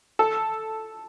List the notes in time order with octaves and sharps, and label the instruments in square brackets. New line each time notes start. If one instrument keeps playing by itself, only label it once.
[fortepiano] A4